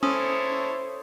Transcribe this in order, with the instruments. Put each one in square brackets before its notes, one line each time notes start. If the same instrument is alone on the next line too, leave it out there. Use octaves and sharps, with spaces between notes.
[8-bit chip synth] C#4 [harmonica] E4 A4 C#5 [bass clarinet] C5 [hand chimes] D#6